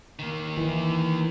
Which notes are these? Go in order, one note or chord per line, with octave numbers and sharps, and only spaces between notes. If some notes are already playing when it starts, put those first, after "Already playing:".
D#3 A#3
E3